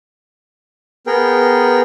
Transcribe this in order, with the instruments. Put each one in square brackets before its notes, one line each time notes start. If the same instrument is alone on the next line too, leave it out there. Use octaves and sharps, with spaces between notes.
[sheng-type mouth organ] B3 G#4 A#4 G5